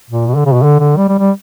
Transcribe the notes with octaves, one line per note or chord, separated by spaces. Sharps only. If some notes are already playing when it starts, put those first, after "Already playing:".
A#2
B2
D3
C#3
B2
D3
D3
G3
G3
G3